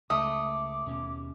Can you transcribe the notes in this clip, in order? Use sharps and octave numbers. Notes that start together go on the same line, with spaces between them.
C#2 A3 D6 D#6
D#2 B2 C#4